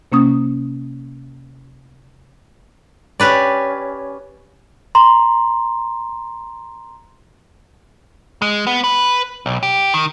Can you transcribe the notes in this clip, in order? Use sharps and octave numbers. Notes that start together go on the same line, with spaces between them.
C3 A#3 C#4 D#6
C#4 G4 B4 D5
A#5 C6
G#3
B3
B4
B1
G4
D#3